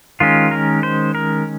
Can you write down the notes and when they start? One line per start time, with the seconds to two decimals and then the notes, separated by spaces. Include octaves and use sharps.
0.20 D#3 G#3 C#4 F4
0.51 A#4
0.83 C5
1.15 A#4